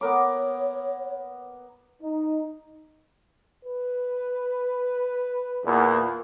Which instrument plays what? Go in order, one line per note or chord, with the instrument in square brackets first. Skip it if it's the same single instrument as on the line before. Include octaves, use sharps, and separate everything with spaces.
[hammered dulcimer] B3 A#4 D6 [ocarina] C#5
[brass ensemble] D#4
[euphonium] B4
[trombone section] E2 A#2